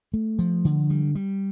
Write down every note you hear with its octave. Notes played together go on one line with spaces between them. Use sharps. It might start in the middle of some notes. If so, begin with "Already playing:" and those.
A3
F3
D3
G3
G3